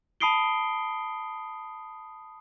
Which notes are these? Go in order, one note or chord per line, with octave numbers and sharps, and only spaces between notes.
A5 B5 D#6 C7 D7 G7